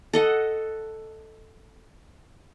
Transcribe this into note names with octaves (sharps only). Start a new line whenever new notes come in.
A4 D#5 F#5